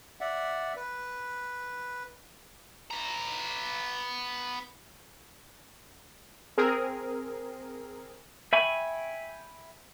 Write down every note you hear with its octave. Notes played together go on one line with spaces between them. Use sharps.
D5 E5 F#5
B4
B3 A#5
C4 G#4 A#4
E5 G5 G#5 B5 C#6